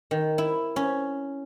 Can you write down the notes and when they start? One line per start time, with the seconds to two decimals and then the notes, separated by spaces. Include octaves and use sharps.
0.11 D#3
0.38 E4
0.76 C#4